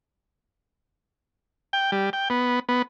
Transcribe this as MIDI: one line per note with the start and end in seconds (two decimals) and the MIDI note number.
1.73 1.91 79
1.92 2.10 55
2.13 2.28 79
2.30 2.60 59
2.69 2.82 59